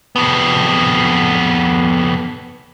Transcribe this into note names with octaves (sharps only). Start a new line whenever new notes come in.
F2 B3